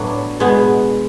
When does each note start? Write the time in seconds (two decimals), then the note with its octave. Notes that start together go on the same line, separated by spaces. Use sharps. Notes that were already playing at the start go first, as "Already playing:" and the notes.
Already playing: A2 F#3 B3 D4
0.40 B2 G#3 B3